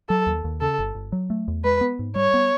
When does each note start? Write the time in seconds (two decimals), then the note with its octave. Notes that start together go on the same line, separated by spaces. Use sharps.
0.09 F#3 A4
0.27 D#2
0.44 D#2
0.61 C#3 A4
0.79 G1
0.95 G1
1.12 F#3
1.30 A3
1.48 E2
1.64 G#3 B4
1.81 B3
1.99 G#2
2.15 G3 C#5
2.34 B3